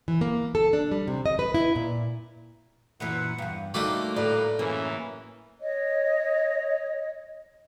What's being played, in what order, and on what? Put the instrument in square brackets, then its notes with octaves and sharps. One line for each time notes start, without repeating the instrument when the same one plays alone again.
[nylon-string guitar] E3
A#3
A4
D4
G3
C3
D#5
B4
E4
A#2
[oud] F#2 A#2 E3 [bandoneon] B4 F#5
[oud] E2 G2
[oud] D2 G3 D#4 [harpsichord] A3 F#4 D5 [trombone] A#3 [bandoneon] C6
[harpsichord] A2 [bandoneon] G3 B4 A#5 [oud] D5
[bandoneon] F#2 C#3 C#4 [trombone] E3 [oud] A#3
[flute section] C#5 D#5